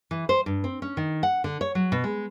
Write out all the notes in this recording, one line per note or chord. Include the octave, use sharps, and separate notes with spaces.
E3
C5
G2
C4
C#4
D#3
F#5
D3
C#5
F#3
B2
G#3